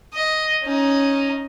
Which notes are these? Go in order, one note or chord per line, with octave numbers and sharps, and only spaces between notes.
D#5
C#4 D#4